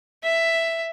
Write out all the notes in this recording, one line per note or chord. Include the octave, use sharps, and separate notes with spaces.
E5